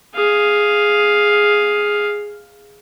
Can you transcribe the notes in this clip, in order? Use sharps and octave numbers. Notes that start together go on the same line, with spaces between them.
G#4 F5